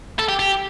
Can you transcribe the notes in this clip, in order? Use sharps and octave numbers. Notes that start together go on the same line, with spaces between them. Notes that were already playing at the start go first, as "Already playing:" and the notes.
A4
G4
G4